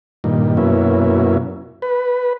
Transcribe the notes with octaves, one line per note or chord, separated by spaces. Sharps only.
G2 A#2 D#3
F#2 B2 A#3 C#4 E4
B4